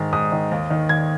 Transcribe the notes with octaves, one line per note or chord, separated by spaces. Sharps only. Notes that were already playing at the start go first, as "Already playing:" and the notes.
Already playing: G#2 D#3
G#2 D#6
D#3
D#2
D#3
D#2 G#6